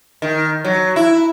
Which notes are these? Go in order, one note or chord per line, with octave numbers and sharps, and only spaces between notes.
D#3
F#3
E4